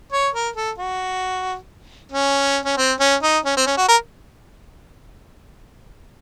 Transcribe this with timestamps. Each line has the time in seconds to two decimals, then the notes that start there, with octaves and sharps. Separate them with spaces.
0.12 C#5
0.34 A#4
0.56 A4
0.78 F#4
2.12 C#4
2.65 C#4
2.77 C4
3.00 C#4
3.23 D#4
3.45 C#4
3.57 C4
3.67 C#4
3.77 F#4
3.88 A#4